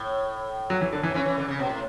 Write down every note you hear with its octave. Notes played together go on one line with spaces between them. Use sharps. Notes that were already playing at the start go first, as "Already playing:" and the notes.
Already playing: A2
F#3
E3
D3
E3
F#3
E3 C#4
E3
D3
C#3
B2
A2